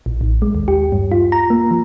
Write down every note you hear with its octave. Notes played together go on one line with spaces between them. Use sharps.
A#1
A1
G#3
D#2
G4
G2
F4
A#5
A#3
F3